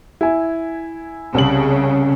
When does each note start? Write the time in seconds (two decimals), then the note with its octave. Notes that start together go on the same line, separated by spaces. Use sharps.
0.21 E4 G#5
1.34 C2 C#3 F#7